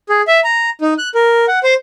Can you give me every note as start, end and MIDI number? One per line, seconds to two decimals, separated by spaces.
0.09 0.22 68
0.28 0.40 76
0.44 0.70 82
0.81 0.94 63
0.98 1.09 90
1.15 1.46 70
1.48 1.59 78
1.64 1.74 72